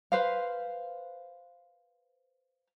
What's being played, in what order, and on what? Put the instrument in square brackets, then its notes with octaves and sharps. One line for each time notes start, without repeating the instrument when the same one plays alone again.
[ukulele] B4 C5 F5